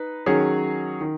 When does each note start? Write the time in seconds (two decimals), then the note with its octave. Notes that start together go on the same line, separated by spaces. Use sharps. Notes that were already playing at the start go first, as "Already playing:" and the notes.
Already playing: D#4 B4
0.26 D#3 F#3 C#4 G#4
1.01 D#3